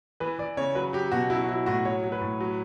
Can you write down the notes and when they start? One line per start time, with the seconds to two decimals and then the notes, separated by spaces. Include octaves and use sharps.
0.20 E3 B4
0.39 E3 D5
0.57 C#3 C#5
0.75 F#3 B4
0.93 F#3 G4
1.12 B2 F#4
1.30 F#3 E4
1.44 F#4
1.49 F#3 E4
1.66 A2 F#4
1.85 F#3 C#5
2.04 F#3
2.12 B4
2.22 A2
2.41 F#3